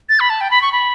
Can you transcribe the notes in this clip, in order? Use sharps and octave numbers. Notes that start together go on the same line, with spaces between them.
A6
B5
A5
G5
B5
C#6
B5